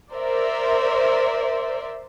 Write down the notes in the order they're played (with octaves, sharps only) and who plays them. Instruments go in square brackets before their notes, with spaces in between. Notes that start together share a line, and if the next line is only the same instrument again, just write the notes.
[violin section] A#4 C5 D5 E5